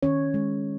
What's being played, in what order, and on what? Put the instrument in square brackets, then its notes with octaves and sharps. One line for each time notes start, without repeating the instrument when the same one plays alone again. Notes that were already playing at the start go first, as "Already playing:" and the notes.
[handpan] D#3 C#4 C#5
G#3